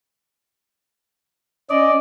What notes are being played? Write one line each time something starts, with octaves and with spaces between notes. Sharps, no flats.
C#4 D5 D#5